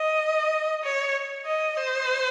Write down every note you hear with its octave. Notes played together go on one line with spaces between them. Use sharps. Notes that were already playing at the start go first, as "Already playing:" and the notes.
Already playing: D#5
C#5
D#5
C5